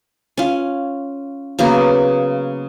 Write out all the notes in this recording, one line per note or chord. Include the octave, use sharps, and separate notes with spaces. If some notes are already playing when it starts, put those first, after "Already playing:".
C#4 F4
C#3 F#3 A#3 B3